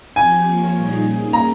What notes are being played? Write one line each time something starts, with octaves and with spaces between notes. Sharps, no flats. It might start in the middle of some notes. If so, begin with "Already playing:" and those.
F3 C4 G4 C5 G#5
F3 A#3 F4 A#4 C#5
A#2 G3 A#3 D#4 G#4
A#3 C#4 G#4
A#5